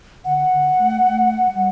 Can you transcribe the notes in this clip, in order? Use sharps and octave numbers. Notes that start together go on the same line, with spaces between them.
D3 F#5
D3
A3
A3
G3